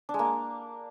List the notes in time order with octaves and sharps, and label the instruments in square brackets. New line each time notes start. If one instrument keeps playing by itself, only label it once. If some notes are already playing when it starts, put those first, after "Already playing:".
[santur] D4
G#3
A#3